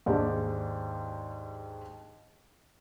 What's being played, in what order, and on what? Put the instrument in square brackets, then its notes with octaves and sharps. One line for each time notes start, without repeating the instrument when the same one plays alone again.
[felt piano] D#2 G#2 G#3 D4 G4 D5